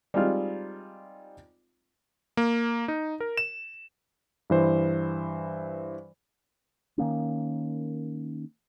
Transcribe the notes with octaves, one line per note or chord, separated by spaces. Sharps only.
G3 G#3 C4 D#4 F4 F6
A#3
D#4
A#4
E7
G2 E3 C5
D#3 A#3 C#4